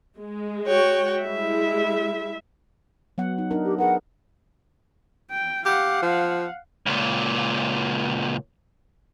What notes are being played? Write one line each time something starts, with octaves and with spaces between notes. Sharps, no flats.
G#3
F#4 C#5 G5
G3 G#3 E4 E5
F#3 B3 F#5
D#4
D4 D#4 A#4
G4
G#4 A#4 B4 F#5
G5
G4 F5 F#5
F3
C#2 A#2